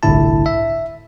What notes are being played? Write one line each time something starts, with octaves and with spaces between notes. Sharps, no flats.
G1 C2 A2 D3 E4 A5
E5